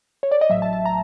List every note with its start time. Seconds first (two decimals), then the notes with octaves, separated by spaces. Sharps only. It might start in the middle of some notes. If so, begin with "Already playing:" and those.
0.23 C#5
0.31 D5
0.41 D#5
0.50 A1 A2 F#3 E5
0.62 A5
0.73 A5
0.85 A#5